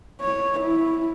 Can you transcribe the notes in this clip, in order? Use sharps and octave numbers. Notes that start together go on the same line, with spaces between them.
C#5
E4